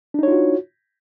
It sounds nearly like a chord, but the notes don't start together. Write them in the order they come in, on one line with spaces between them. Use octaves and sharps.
D4 D#4 C#5 F4 F#4